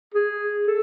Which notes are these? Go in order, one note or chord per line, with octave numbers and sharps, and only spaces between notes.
G#4
A4